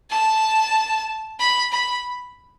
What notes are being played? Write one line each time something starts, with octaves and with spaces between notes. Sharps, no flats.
A5
B5
B5